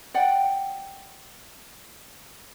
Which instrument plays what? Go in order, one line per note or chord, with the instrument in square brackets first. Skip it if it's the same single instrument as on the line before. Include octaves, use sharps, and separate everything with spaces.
[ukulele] D5 F#5 G5